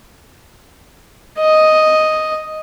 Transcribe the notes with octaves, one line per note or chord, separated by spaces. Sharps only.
D#5